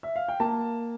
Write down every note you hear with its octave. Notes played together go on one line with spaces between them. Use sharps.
E5
F5
G5
A#3 A5